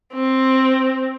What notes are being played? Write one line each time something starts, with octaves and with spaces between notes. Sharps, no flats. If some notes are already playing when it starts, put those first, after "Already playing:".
C4